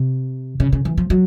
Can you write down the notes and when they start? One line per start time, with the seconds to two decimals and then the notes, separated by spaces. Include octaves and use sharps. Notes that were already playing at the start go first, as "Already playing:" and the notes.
Already playing: C3
0.60 C#3
0.73 C#3
0.85 E3
0.98 F3
1.10 F#3